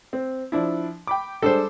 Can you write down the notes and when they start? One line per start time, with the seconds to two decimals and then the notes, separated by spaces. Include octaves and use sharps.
0.13 C4
0.52 F3 D4 E4
1.07 G5 B5 D6
1.42 G3 G#3 D4 A4 C5